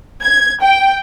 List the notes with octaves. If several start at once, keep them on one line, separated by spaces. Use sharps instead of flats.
G#6
G5